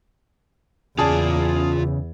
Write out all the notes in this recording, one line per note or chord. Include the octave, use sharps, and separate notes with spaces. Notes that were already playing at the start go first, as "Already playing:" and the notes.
E2 C#3 F4 G#4 D5 A5